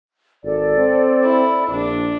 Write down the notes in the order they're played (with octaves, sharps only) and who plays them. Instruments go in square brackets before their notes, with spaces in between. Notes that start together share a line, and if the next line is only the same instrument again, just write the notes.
[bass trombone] G#1 [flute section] A4 D5
[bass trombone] C4
[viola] E4
[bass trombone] A#1 [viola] D4